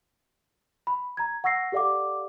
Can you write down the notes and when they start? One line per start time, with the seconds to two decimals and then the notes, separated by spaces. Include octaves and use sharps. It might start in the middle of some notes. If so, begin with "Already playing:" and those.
0.87 B5
1.17 A#5 G#6
1.44 F#5 C#6 E6 A#6 C7
1.72 G4 A4 D5 F5 F#5 D6